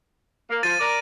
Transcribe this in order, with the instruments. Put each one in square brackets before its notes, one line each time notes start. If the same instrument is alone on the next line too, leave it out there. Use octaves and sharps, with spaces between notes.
[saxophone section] A#3
[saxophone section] F3 [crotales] A6 D#7
[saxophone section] A#4 D5